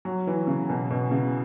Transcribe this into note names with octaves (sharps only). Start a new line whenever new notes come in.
F#3
E3
C#3
B2
B2
C#3